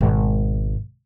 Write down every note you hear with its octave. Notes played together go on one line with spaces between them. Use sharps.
G#1 B2